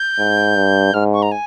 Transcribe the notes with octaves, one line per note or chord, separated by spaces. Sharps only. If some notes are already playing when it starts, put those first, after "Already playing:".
Already playing: G6
G#2
G2
G#2 F6
C#6
A#5
G#5